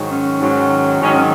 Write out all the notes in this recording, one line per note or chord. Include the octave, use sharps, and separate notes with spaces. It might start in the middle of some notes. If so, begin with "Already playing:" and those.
Already playing: G#2 D#3 F#3
C#4
G#2 D#3 F#3
G#2 D#3 F#3 C#4
C#4